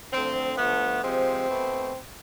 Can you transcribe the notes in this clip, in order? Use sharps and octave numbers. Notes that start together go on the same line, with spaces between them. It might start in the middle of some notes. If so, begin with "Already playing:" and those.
D3 F3 A3 C4
D3 F3 A3 B3
C3 F3 G#3 C4
B2 A3